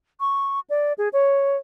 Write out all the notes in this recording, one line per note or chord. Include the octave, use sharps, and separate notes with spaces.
C#6
D5
G#4
C#5